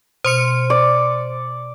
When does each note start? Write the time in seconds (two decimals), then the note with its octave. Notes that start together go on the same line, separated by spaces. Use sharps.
0.24 B2 C5 C6 C#7
0.70 D5